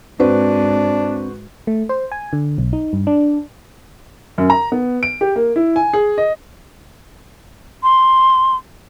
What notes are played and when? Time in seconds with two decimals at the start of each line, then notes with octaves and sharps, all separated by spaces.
0.20 G#2 C4 D4 F#4 B4 C5
1.67 A3
1.89 C5
2.12 G#5
2.33 D3
2.58 B1
2.73 D#4
2.93 G2
3.07 D4
4.38 F#2
4.50 A#5
4.72 B3
5.03 D7
5.21 G4
5.36 A#3
5.56 E4
5.76 G#5
5.93 G#4
6.18 D#5
7.83 C6